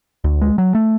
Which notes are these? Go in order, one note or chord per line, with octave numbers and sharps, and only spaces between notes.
D2
G#3
F#3
A3